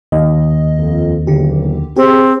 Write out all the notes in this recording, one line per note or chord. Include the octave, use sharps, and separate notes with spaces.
D#2 D#5
F2
F#1 B1 D3 G4
C4 G4 G#4